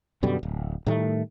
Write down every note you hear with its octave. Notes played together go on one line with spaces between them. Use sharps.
F#2 B2 D3 G3
D1
A2 D#3 G3 A3